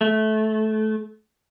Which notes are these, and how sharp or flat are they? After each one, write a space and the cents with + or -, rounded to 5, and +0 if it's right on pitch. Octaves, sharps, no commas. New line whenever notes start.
A3 -20